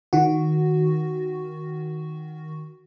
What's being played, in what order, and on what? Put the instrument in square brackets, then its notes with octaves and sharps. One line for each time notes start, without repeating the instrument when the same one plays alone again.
[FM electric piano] D#3 F#4